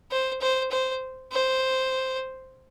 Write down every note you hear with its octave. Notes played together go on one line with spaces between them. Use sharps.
C5
C5
C5
C5